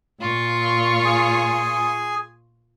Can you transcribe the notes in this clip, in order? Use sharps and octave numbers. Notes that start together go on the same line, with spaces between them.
A#2 F4 C#6
G#4 G#5